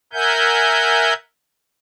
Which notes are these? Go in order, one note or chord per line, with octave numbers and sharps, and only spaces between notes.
A#4 E5 F#5 G#5 G6